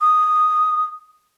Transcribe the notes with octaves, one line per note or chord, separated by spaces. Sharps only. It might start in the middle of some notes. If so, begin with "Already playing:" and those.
D#6